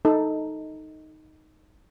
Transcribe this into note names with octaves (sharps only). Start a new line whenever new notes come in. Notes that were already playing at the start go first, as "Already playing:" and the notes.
D#4 A4